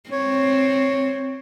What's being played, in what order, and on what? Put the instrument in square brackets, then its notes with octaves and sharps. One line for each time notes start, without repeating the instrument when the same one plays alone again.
[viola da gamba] C4 [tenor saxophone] C#5